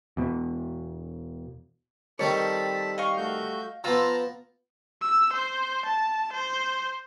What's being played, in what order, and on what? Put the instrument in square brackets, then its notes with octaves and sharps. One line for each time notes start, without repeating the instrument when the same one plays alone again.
[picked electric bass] E2 B2
[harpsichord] D#3 C4 D#4 [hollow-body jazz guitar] G3 C#5 [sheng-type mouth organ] A4 A5 B5
[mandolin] D#5 F5 C#6
[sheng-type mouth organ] A3 F#4 G6
[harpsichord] F3 B3 [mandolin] F4 E6 [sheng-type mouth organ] A5 A#5
[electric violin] E6
C5
A5
C5